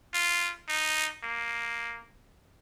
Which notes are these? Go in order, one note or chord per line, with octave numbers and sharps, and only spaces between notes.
F4
D#4
A#3